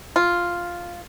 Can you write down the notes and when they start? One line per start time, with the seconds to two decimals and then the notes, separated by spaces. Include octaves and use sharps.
0.16 F4